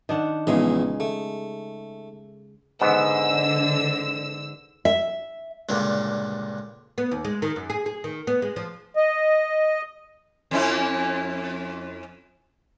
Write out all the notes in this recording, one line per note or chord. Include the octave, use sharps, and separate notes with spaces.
D#3 D4 F#5
A#1 E2 C#3 G#3 D#4 E5
A3
G#2 D3 B3 E6
E5
C#2 G2 A#2 D3
B3
D#2
G#3
D#3
F#2
G#4
G#4
D#3
B3
G#3
F3
D#5
F2 C#4 E4